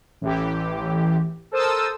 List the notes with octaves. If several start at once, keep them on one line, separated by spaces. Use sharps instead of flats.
A1 E3 G4
A4 A#4 C5 A5 D#6 E6